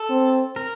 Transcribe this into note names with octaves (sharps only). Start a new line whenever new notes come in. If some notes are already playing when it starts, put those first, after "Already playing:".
Already playing: A4
C4
A#4